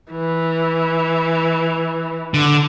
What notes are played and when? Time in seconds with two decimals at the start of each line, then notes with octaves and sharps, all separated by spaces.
0.12 E3
2.34 D3